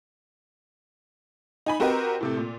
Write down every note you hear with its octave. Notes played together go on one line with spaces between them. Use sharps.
D#4 G#5 B5
C4 F#4 G4 A#4 B4 D#5
A2 C3 A3
A#2